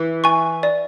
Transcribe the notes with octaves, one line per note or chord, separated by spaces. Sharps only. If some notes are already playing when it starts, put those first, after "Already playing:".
Already playing: E3
G#5 C#6
D5